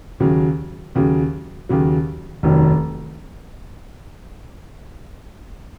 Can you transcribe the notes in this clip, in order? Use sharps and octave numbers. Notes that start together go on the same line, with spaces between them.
D#2 C#3 F#3
D#2 C#3 F#3
D#2 C#3 F#3
F1 D#2 D#3 F#3 C#4